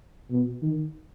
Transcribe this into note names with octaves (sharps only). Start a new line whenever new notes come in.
B2
D#3